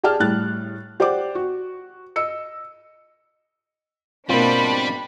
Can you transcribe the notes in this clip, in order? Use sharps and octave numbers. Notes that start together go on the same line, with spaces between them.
G4 G#4 D5 G5 A5 F6
A2 G3 F#6 A6
G4 C5 D5 F#5 D6
F#4
D#5 E6 C#7
G#2 B2 G3 A#3 C4 D4 F4 B5